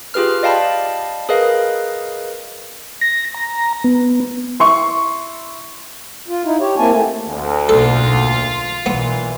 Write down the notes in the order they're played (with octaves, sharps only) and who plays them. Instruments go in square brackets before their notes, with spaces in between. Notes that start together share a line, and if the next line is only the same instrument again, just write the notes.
[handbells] F4 G4 G#4 B4 F6
D5 D#5 F5 G5 A5 B5
G#4 A#4 B4 D#5 F5
[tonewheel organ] A#6
A#5
B3
[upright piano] E4 C6 C#6
[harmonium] F4
D#4 E4
G4 C#5
A#3 C4 E4 G#5 A5
A3
[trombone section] D2
[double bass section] B1 G#2 A#3 [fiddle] F4 [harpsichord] A4
[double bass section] B1 [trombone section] A#2 E3 [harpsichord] B3